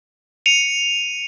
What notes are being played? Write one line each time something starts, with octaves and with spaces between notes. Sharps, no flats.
C#7 D#7 F7